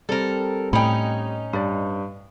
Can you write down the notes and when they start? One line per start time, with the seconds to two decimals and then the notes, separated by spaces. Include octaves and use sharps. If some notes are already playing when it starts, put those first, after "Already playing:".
0.09 G3 C4 A4 A#4
0.73 A2 C#4 D#4 G5 B5
1.53 G2 B4 D5